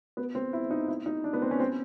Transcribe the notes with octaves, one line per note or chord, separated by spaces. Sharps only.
B3
C4
E4
D#4
E4
D#4
D4
B3
C4
C#4
C4